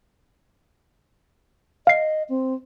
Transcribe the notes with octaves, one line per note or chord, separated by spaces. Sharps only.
D#5 F5 C7
C4